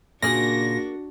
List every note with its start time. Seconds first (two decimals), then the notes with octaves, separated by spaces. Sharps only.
0.22 A#2 C#3 A#3 D4 F#4 G#4 G#5 A#6